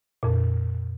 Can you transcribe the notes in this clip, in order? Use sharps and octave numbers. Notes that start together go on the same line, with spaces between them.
F2 A#2